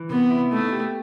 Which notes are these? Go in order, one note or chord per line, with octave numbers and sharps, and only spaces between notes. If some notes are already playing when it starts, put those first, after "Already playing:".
Already playing: E3
C3 B3
E4
A3 D#4
G4